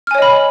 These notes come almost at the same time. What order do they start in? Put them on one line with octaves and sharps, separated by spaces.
F6 G#5 C#5 D#5 B5